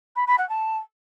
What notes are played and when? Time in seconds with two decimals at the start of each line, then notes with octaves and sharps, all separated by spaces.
0.16 B5
0.27 B5
0.38 F#5
0.49 A5